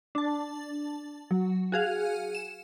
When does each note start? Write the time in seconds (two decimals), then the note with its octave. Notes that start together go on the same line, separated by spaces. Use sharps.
0.15 D4 A5
1.31 F#3
1.72 F#4 G#4 F5
2.35 E7